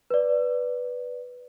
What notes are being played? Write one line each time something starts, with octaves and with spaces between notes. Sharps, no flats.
B4 D5